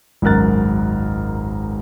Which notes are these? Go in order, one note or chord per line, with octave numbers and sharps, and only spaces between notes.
G#1 C#2 F#2 A#4 F#6 A6